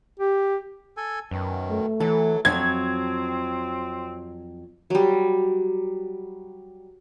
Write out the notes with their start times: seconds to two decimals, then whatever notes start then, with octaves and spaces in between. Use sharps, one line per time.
0.20 G4
0.97 A4 G#5
1.31 F#2 B2 D#3
1.70 A3
2.00 E3 F#3 A4
2.45 F2 F#3 C4 G#6
4.90 F#3 G3